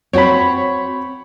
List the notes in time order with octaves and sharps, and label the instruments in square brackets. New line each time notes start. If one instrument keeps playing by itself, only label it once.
[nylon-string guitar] C4 F#4 C5 [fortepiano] C#5 B5